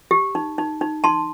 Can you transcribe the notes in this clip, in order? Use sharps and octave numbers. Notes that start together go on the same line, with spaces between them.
G4
D#4
D#4
D#4
D#4 A5 C6